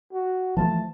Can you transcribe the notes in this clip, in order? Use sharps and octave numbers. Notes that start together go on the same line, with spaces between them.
F#4
E3 F3 A3 A5